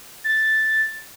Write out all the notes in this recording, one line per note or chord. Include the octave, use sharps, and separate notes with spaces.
A6